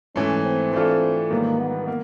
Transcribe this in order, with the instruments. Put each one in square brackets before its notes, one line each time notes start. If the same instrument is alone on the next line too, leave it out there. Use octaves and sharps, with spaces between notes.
[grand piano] G#2 E3 A3 [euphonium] C#4
[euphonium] C4
[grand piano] E3 A3 D4 F4 A4
[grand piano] G#2 D#3 G3 B3 [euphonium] A#3
[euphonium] B3
[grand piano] A#3